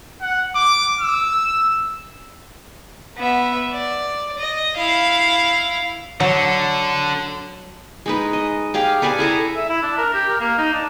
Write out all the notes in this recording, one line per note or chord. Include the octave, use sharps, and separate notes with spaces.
F#5
D6
E6
B3 E5
D5
D#5
E4 F5
D3 F#3
G#3 D#4 B4
D#5
G4 G#4 F5 G5
A4 B4 D5 G#5
E4 G#4 A4 A#5
E5
E4
D4
A#4
G4
A#4
A#3
D#4
D4